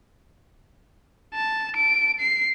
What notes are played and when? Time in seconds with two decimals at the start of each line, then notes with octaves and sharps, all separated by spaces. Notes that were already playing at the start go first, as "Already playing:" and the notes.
1.34 A5
1.76 D7
2.20 C7